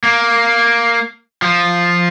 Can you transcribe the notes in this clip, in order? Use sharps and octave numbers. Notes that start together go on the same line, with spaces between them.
A#3
F3